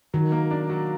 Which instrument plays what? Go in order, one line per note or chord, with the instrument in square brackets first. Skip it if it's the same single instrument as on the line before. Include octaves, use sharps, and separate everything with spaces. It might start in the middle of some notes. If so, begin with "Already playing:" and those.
[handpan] D#3 [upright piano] F#3
[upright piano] A#3
D4
F#3